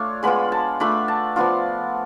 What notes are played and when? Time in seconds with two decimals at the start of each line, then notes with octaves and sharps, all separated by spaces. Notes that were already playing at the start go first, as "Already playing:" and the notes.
Already playing: A3 D4 F4 C#5
0.23 G#3 B3 F4 B5
0.52 A5
0.80 A3 D4 F4 B5
1.08 A5
1.36 F3 B3 D4 F4